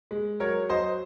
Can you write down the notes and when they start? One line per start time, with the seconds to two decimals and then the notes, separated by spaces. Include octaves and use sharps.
0.11 G#3
0.40 F#3 A#4 C#5
0.69 F#3 C5 D#5